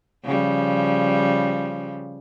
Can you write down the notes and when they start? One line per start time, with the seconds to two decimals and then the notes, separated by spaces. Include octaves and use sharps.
0.24 C#3 F3 G3